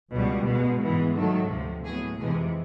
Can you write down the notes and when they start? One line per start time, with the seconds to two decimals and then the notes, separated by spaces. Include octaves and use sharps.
0.12 C#2 B2 G3
0.46 B2 G#3 B3
0.81 G#2 E3 G#3 B3
1.15 G#2 D#3 F#3 A3 A4
1.50 D2 C3 F3
1.85 A2 F#3 B3 G#4
2.19 F2 C3 E3 G#3 G#4